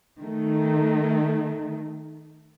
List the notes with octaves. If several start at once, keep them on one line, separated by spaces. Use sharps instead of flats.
D#3 A3